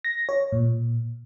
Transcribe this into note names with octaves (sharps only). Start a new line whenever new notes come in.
A#6
C#5
A#2